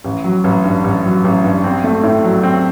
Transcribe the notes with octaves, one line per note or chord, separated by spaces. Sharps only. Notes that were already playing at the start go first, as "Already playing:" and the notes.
A1
F#3
A1
G2
A1
F#3
A1
G2
C4
A3
A2
F#3
C4